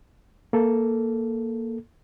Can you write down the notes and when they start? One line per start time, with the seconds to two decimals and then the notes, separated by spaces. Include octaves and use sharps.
0.53 A#3 A4